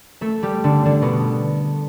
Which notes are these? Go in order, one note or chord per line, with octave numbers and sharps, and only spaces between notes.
A3 A4
G3 G4
D3 D4
D3 D4
B2 B3